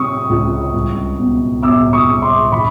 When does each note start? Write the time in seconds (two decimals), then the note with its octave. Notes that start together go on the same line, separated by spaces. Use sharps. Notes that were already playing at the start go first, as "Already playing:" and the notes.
Already playing: C3 F#3 C#6 D#6 E6
0.30 C#2
0.74 C2
1.19 B2
1.63 B2 D6 E6
1.93 C#6 D#6
2.08 C2
2.22 C6 D6
2.52 D3 B5 C#6